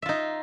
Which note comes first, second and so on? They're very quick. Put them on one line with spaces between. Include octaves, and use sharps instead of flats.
E5 F4 D#4